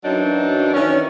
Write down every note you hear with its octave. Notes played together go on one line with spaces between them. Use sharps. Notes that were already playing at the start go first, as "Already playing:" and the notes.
F#2 E3 F#3 D4 D#4
D#3 E3 C#4